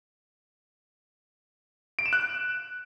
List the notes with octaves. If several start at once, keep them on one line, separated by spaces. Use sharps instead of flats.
D7
E7
F#6